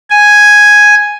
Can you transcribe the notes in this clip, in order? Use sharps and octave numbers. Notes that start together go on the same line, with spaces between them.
G#5